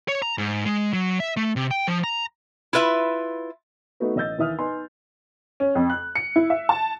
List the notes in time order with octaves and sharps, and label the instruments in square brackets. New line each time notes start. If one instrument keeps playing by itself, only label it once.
[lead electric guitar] C#5
A#5
G#2
G#3
F#3
E5
A3
C3
G5
F3
A#5
[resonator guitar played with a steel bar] E4 F4 B4 E5
[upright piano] A3 B3 D#4 F#4 B4
A1 D#5 E6 G6 A6
D#2 E3 E5 D#6 F6
D#4 B4 G#5 C6
[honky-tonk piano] C#4
F2
F#6
C#7
E4
E5
A5